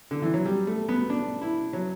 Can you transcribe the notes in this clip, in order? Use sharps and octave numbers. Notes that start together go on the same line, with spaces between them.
D3
E3
F#3
G3
A3
B3
D4
E4
F#3